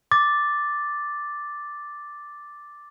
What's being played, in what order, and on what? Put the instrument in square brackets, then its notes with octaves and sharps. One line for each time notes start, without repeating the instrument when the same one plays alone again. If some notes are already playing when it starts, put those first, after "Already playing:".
[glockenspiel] D6 A6